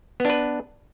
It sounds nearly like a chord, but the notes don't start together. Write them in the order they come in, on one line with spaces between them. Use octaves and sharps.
B3 D4 B4